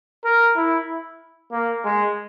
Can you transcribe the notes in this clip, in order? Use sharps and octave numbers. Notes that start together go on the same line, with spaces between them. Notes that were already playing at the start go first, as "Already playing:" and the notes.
A#4
E4
A#3
G#3